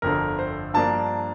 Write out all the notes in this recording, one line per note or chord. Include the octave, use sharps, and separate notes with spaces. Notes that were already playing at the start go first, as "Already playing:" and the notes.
G1 F2 D3 A#4
C5
G2 F3 A#3 D4 A5